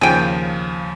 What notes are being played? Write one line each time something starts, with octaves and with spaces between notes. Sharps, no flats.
D#2 C#3 F3 G5 G#5